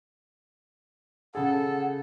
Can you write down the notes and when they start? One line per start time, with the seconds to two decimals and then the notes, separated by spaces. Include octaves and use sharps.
1.35 C#3 G#4 A4 F#5